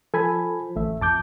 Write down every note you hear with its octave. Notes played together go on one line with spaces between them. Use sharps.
F3 A4 G#5 B5
A1 D2 A3 E5
F2 A5 D6 G6